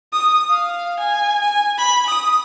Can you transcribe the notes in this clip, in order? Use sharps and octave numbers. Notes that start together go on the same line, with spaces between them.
D#6
F5
G#5
G#5
B5
D#6